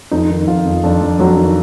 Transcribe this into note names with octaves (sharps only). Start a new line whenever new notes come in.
F2 D#4
D#3
F2 F4
F2
F2 D4
F2
F2 F#3
D#3